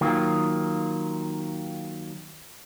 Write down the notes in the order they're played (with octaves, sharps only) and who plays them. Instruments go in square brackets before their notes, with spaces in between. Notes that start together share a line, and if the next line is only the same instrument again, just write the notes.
[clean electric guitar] D#3 F#3 A#3 F4